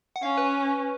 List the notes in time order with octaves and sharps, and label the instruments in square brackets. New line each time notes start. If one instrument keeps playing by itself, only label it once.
[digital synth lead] F#5
[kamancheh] C#4 [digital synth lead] F5
[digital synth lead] B4